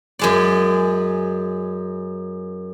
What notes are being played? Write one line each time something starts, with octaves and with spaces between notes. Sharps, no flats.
F#2 G#3 D5